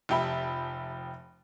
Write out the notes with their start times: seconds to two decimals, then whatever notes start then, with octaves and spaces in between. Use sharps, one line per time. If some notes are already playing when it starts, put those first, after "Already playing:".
0.09 F1 F3 G4 E5 B5